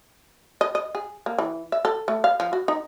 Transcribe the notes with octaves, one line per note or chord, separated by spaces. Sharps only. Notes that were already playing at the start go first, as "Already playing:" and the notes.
D#5
D#5
G#4
A#3
E3
E5
A4
A3
F5
F3
F#4
D#4